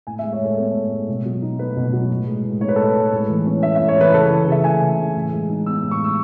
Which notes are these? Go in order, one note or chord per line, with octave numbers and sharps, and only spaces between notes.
A2 G#5
E5
G#3
C#5
A2 A4
B3 A4
A2
G#3
B2
F#3
D#4
A3 B4
B2
F#3
A2
G#3
A2
D#4 C#5
B4
A2 A4
B4
G#3
A2
E3
C#4
A3 E5
E5
A2
C#5
E3 B4
C#3 A4
E3
C#3 E5
A3 G#5
C#3
E3
A2
G#3
D#4
B3 E6
A2
C#6
G#3 E6